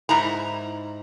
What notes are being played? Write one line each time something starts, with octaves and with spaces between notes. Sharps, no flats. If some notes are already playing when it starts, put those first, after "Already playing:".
G#2 E4 A#5